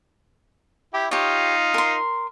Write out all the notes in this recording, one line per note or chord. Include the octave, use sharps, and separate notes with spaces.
E4 G4
D#4 F4 G4 C#5
A#4 C6